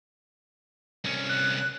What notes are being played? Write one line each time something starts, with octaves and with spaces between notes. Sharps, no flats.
C2 C#4
F#6